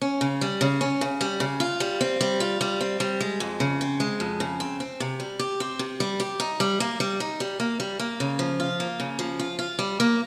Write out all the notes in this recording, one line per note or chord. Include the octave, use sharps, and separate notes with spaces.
C#4
C#3
G3
C#3
C#4
C#3
G3
C#3
F4
G3
C4
G3
F4
G3
C4
G3
G#3
F2
C#3
C4
G#3
F2
C#3
C4
C4
C3
G3
G4
C4
C3
G3
G4
D#4
G3
A#3
G3
D#4
G3
A#3
G3
A#3
C#3
F3
F4
A#3
C#3
F3
F4
F4
G3
A#3